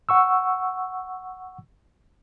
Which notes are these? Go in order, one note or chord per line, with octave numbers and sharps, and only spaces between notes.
F#5 C#6 E6